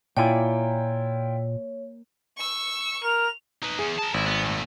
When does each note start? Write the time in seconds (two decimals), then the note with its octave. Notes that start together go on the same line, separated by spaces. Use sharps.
0.17 A#2 A#3 E4 F4 C#5 D5 G5 G#5
2.37 C#6 E6
3.04 A#4 F7
3.63 D#4 B4
3.79 E2 G#4
3.99 A#4 A5
4.14 G#1 E4
4.26 B3
4.43 A#2 A3